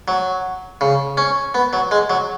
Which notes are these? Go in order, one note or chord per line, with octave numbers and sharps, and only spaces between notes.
F#3
C#3
C#4
B3
F#3
G#3
F#3